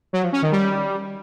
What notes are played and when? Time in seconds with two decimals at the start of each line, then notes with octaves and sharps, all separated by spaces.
0.13 F#3
0.23 F3
0.33 C#4
0.42 D#3
0.52 G3